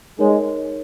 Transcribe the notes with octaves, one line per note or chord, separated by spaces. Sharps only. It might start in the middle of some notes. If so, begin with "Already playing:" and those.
G#3 D#4 A#4 C#5